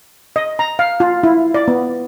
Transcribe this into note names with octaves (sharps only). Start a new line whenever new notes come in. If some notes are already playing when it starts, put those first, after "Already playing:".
D#5
A#5
F5
F4
E4
D5
B3